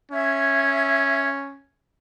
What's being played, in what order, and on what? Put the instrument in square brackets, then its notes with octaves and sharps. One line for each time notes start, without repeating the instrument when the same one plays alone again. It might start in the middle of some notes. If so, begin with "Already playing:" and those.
[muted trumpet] C#4 [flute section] E5 G#6